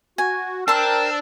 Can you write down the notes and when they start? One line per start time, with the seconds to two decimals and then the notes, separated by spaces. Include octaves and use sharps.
0.18 F#4 G#5
0.68 D4 A#4 C5 G5 A5 E6